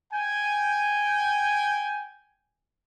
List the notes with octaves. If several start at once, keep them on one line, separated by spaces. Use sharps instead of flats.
G5 G#5